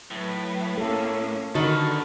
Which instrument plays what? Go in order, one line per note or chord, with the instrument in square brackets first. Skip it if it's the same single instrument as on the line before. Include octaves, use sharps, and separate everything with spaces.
[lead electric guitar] A2 [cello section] F#3 B4
[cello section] A#3 C#4 [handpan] A4
[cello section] D3 [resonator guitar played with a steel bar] D#3 [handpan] F#4 [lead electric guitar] A4 B4